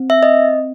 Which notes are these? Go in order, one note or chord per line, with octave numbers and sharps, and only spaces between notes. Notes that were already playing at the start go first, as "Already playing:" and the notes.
Already playing: C4
E5
D#5